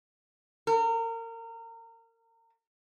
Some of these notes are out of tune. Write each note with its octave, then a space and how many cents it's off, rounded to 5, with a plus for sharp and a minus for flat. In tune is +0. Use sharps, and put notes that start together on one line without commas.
A#4 -30